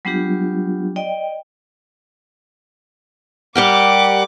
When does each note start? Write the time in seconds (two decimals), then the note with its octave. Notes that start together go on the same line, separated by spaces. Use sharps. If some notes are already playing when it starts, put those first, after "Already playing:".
0.05 F#3 G3 B3 D4 F4 G4
0.96 D5 D#5 G5
3.55 G3 G4 A#4 F#5 D6